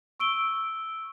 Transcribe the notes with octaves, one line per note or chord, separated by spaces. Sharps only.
C#6 E6 D7 D#7 G7